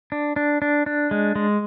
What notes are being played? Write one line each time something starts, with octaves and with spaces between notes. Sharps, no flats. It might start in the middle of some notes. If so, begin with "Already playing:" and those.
D4
D4
D4
D4
G#3
G#3